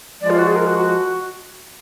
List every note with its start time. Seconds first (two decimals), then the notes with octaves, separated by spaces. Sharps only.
0.21 F3 G#3 D5
0.30 F4
0.39 F#4
0.47 G#4
0.56 A#4
0.67 F#4
0.78 F#4